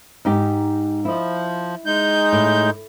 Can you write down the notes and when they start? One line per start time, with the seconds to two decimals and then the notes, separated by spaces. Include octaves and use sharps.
0.25 G#2 D#4 G4
1.05 F3 E4 D#5
1.86 G#3 D#4 G6
2.33 A2